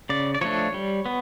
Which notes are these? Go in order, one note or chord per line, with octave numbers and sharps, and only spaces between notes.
C#3 D5
D5
F3 A3 D4 C#5
G3
B3